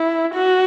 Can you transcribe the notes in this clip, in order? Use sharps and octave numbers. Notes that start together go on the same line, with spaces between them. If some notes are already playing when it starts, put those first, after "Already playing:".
Already playing: E4
F#4